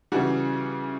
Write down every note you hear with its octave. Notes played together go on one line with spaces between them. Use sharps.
C#3 E3 G3 F#4